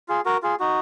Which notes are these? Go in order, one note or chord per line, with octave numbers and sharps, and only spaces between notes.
F4 G#4
F#4 A#4
F4 G#4
D#4 F#4